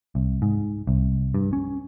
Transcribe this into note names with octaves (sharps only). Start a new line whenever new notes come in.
C2
G#2
C2
G2
C#4